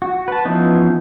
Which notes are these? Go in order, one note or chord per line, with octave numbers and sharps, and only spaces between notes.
F#4
B4 A5
E3 F3 B3 C#4 D#4